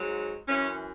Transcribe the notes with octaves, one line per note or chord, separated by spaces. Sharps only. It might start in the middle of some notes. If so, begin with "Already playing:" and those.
Already playing: G#2 F#3
F#2 E3 C#4